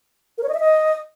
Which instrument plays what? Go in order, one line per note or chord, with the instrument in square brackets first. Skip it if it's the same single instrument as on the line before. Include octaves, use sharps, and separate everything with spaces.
[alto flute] A#4
C#5
D#5
E5
D#5